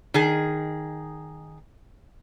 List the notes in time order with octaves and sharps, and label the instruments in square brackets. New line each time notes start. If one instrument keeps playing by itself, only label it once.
[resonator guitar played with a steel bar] D#3 G#4